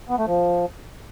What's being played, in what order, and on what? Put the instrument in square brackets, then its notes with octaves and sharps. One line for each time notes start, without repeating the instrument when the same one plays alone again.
[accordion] B3
A3
F3